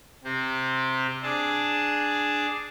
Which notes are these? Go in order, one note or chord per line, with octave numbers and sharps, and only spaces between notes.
C3 C4 G4
D4 G#4 A5